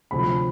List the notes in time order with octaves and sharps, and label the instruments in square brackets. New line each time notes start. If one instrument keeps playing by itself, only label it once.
[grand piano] D2 C3 F3 B5